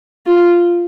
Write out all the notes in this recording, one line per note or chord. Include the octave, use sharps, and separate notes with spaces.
F4